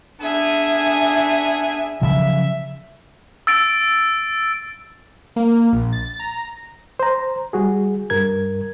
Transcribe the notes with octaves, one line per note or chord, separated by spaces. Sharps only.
B3 D4 G#4 E5 G#5
C#3 F3 F#3 E5
E6 A6 D7
A#3
A#1
A6
A#5
A#5
C5 A#5
G3 F#4 G#4
G2 A#4 G#6